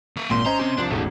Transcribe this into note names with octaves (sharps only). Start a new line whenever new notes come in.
A#3 E5
G#1 A#2 C6
C#4 C5 D#5 A#5
C4 G4
C2 F3 D4
E1 A1 D#3 A3